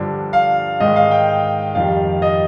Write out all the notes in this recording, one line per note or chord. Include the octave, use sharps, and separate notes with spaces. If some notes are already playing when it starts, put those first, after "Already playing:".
Already playing: G2 D3 F3
F5
G#2 D#3 G#3 D#5
F5
G5
F2 D#3 G3 F5
D#5